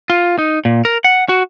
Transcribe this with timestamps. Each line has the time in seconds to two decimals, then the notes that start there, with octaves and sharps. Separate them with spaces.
0.10 F4
0.39 D#4
0.65 A#2
0.85 A#4
1.04 F#5
1.29 F#4